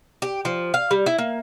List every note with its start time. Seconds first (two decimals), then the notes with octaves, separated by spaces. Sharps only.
0.22 G4
0.45 F3
0.74 F5
0.91 G3
1.06 E4
1.18 A#3